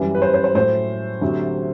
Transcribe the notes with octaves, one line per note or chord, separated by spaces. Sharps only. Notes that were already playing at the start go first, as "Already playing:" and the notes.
Already playing: F#2 E3 G3
B4
C5
C5
C5
A2 F#3 A3 C5
D2 C3 F#3